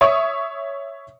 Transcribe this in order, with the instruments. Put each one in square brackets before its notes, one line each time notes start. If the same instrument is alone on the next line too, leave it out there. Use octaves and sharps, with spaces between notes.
[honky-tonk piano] C#5 E5 C#6 D#6